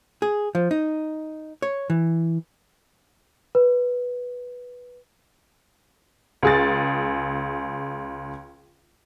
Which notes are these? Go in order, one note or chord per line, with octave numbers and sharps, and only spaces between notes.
G#4
F3
D#4
C#5
E3
B4
C#2 G#4 A6